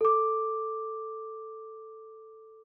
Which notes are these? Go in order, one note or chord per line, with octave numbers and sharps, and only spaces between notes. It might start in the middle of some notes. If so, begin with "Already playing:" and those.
A4 D6